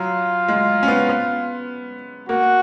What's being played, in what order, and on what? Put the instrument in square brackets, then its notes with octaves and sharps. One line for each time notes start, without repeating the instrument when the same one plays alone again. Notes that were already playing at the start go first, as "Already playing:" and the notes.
Already playing: [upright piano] F#3 [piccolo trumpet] F4
[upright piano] G#3
C#4
B3
B3
[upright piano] A#3 [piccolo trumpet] F#4